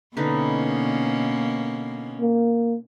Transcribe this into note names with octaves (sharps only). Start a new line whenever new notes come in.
B2 D3 A#3 C#4 D#4 B4
A#3